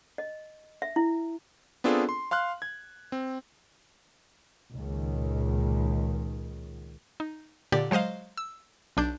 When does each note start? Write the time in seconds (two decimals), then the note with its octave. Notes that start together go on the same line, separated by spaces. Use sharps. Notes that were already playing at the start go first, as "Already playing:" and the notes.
0.18 D#5
0.82 E5
0.96 E4
1.84 B3 C4 D4 F4 G#4 A4
2.09 C6
2.31 F5 C6 F6 F#6
2.62 G#6
3.12 C4
4.72 C#2 A#2 D#3
7.20 D#4
7.72 A#2 D3 G4 D5
7.91 F#3 G#3 C5 D#5 F5
8.37 E6
8.97 B1 D4 G6